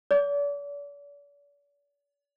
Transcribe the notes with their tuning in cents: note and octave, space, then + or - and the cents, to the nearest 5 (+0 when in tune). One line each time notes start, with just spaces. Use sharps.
D5 -45 D6 -30